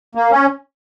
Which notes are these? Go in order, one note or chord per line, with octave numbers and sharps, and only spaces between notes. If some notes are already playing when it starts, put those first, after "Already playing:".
A#3
C#4